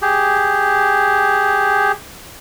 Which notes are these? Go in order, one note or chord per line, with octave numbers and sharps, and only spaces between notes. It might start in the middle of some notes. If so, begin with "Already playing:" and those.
G4 G#4